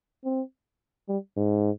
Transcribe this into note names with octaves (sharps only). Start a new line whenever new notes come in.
C4
G3
G#2